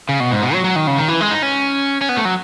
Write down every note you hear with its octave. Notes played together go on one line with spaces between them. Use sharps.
C#3
B2
G#2
B2
F#3
F#3
D#3
C#3
D#3
E3
G#3
D#4
C#4
C#4
B3
A3
F#3